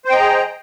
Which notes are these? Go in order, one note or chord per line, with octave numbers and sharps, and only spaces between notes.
G#4 C5 D#5 G5 A#5